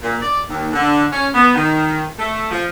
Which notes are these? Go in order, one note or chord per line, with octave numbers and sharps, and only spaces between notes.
A#2
D5
D#2
D3
C#4
B3
D#3
A3
F3